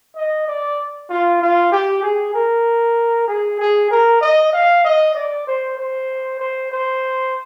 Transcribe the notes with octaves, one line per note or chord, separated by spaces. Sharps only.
D#5
D5
F4
F4
G4
G#4
A#4
G#4
G#4
A#4
D#5
F5
D#5
D5
C5
C5
C5
C5